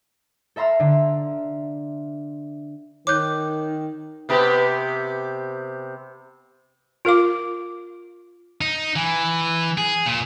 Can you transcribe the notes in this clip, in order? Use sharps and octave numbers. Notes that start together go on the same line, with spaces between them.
A4 E5 A#5 C6 E6 F6
D3
D#3 C#5 D6 F#6 G6
C3 B3 G4
F4 A#4 F5 D6
D#4
E3
G#4
A#2